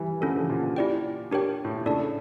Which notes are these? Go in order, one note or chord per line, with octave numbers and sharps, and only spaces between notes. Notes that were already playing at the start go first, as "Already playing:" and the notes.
Already playing: E3 G3
D3 F3 C#4 E4 A4
C#3 E3
A#2 D3
A#2
E4 G4 D5 G5
D4 G4 A#4 C#5 G5
A2
A#2
A2 C#3 D4 A4 D5 A5